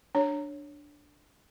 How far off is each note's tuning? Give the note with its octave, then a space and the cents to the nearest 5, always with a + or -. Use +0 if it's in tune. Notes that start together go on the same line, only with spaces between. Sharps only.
D4 +0 C#5 +0